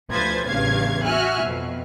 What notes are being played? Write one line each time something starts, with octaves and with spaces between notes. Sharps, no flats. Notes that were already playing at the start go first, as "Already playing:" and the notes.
D2 F3 B4 C5 G#6 A6
A1 E2 G2 C#3 F5 G#6
F#4 E5 G#5 F6 F#6
F2 B2